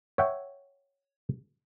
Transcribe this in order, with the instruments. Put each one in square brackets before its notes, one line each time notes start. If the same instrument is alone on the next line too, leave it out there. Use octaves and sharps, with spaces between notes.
[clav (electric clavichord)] C#5 E5 F#5 G5